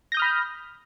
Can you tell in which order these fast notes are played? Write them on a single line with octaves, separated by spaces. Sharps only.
A#6 G6 D#6 F6 B5